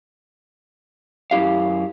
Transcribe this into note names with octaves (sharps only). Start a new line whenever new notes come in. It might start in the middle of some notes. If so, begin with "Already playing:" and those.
F#2 E4 G4 F5